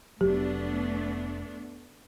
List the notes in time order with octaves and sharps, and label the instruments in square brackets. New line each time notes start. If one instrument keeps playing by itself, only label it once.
[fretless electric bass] F1 F#3 [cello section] A3 B3 D4 [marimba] G4